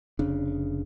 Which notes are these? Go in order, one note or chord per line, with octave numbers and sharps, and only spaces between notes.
F1 C#3 D4